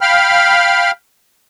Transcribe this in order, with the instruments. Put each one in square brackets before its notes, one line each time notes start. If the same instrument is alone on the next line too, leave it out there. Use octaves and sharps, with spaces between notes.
[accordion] F5 G5 B5 F6